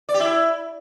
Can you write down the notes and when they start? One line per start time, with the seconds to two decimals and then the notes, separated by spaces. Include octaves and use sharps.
0.09 D5
0.14 G4
0.20 E4